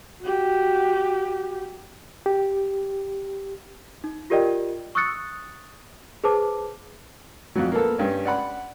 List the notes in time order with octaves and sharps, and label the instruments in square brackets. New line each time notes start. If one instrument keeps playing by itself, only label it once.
[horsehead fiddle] F#4 G4
[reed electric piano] G4
[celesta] D#4
F4 G4 A#4 D5 D#5 G5
C#6 D#6 E6 F#6 A6 C#7
G#4 B4 C5 A5 D6
[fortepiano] F2 F#3
A#3 B3 A4
G2 C#4
D5 F#5 B5